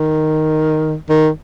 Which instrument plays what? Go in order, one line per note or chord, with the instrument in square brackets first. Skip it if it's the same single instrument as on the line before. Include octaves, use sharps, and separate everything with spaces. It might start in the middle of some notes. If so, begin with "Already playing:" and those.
Already playing: [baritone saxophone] D#3
D#3